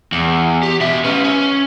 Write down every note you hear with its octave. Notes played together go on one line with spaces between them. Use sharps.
E2
G4
B2 E5
C#4 B4
C#4